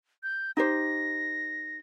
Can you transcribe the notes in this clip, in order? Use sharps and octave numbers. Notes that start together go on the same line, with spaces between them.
G6
D#4 G4 C5 A#6